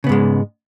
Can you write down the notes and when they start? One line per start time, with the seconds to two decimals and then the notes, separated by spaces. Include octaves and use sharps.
0.04 C#3
0.07 B3
0.09 G#2
0.12 G#3